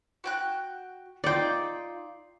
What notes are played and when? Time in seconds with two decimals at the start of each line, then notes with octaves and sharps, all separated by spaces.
0.24 F#4 G5 F#6
1.24 D#4 F4 D5 G5